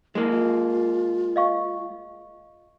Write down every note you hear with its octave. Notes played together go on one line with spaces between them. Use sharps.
G#3 A#3 E4
F4
D#5 F5 C#6